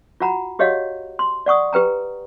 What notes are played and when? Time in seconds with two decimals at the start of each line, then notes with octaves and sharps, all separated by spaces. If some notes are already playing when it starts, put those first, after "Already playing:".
0.20 F4 F#4 F#5 A#5 B5
0.59 F#4 G4 C#5 D#5 F5 F#5
1.19 C6
1.46 D5 F#5 C#6 D#6
1.73 G4 B4 G5 A#5